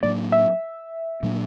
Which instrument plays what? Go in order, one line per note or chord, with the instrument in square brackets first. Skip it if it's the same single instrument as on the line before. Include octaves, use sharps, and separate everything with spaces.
[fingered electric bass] A2 F#3 A#3 D4 [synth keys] D5
[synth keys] E5
[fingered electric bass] A#2 F#3 A#3 D4